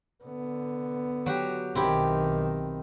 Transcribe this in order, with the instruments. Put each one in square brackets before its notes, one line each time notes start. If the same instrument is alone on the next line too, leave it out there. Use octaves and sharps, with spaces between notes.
[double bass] D3 B3
[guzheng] F#3 F#4 G4
[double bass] B1 D#3 [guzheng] C4 E4 G4